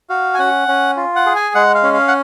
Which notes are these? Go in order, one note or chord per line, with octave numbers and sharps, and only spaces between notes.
F#4 F5
G#5
C#4 F#5
C#4
F4
F#5
G#4
G#5
G#3 F#5
F5
C#4
F5
F#5